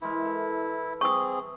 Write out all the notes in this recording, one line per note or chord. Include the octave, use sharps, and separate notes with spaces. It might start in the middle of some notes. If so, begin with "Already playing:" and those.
E3 G#3 E4 A#4
A4
C4 G#4 C#6 D#6